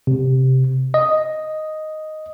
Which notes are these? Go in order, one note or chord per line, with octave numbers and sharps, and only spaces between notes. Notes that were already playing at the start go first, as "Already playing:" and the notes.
C3
D#5